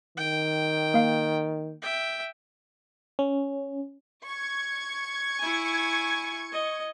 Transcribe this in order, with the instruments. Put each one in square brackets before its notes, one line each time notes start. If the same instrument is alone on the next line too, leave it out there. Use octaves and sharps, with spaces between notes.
[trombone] D#3 [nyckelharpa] G5
[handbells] A#3 F5
[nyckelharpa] E5 G5
[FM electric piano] C#4
[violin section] C#6 G#6
[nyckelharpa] E4 G#5
D#5